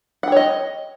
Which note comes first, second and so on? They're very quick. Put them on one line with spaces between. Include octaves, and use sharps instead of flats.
F#5 G5 C#5 D#5